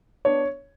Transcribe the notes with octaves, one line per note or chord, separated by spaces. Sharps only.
B3 D4 C#5